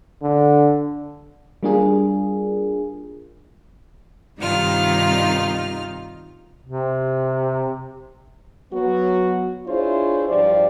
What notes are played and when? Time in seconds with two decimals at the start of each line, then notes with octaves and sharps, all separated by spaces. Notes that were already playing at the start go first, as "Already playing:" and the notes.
0.23 D3
1.63 G3 A#3 D4 F4 G#4 A#4
4.39 G2 C3 D#3 D#4 F4 F6
6.64 C3
8.73 F#3 B3 F#4
9.67 D4 E4 F4 G#4 C5 C#5
10.29 G2 F3 G4 D5